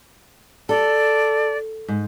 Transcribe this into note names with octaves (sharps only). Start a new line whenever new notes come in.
A4 D5
G#2